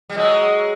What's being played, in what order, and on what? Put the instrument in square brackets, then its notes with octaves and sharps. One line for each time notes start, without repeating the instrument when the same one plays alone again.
[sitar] G3
[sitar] F#3 G#3 [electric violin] D#5